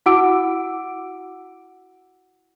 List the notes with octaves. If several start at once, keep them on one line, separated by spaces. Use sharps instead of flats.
E4 F#4 F#5 D6 E6 D7